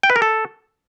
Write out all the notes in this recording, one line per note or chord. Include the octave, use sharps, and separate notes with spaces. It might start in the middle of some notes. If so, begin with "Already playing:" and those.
G5
B4
A#4
A4